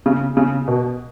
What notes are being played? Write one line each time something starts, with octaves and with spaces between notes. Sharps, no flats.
C#3
C#3
B2